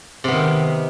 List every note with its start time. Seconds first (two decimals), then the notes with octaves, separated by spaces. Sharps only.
0.24 C3
0.28 B3
0.32 D#3